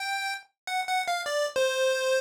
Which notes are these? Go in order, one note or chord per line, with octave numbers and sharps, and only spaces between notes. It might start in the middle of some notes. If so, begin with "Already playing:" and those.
Already playing: G5
F#5
F#5
F5
D5
C5